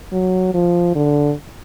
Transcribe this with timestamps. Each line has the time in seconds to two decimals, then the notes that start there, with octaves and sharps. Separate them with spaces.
0.12 F#3
0.54 F3
0.95 D3